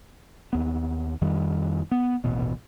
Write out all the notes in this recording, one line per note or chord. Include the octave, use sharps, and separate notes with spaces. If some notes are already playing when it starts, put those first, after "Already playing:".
D#2 B3
F2 D#3 G3
B3
D#1 A1 B2